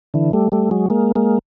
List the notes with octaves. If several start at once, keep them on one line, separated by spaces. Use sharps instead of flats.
D3 E3
G3 A3
G3 A3
F#3 G#3
G#3 A#3
G#3 A#3